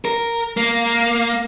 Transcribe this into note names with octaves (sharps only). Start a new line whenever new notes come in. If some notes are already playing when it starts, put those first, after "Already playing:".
A#4
A#3